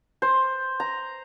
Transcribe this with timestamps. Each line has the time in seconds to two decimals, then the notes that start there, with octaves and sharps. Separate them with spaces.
0.22 C5
0.80 A#5